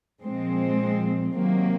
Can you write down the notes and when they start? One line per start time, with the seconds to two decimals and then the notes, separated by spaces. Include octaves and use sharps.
0.23 A#2 F3 G#3 C4
1.34 C3 D#3 F#3 A#3